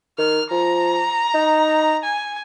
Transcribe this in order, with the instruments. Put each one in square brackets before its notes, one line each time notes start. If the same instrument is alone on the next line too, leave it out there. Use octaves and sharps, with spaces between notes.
[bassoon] D#3 [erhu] F6
[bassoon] F3 [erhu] A#5
[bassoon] D#4
[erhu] G#5